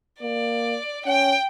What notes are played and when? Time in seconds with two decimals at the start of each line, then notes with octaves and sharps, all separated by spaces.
0.22 A#3 D5
1.06 C#4 G5